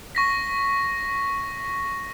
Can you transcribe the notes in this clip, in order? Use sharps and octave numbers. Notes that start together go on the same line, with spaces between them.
C#6 A#6 B6